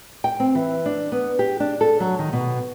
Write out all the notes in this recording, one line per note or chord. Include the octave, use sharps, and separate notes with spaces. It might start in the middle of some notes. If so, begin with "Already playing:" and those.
G5
C4
E3
D4
B3
G4
D4
A4
F#3
D#3
B2